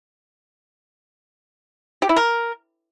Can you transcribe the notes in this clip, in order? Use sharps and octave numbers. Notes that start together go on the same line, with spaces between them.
G4
E4
A#4